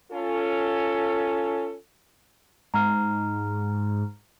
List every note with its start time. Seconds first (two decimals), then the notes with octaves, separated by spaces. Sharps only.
0.12 C#4 F4 A4
2.74 G#2 A#5 F6